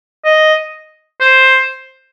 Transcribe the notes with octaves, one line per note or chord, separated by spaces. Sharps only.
D#5
C5